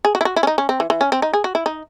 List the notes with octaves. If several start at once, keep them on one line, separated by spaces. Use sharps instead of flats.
G#4
F#4
E4
F#4
E4
C#4
D#4
C#4
C4
E3
E3
C#4
C4
D#4
G#4
F#4
E4
D#4